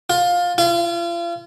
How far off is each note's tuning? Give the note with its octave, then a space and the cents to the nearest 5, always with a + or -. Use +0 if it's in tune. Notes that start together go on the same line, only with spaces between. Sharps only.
F4 +20
F4 -35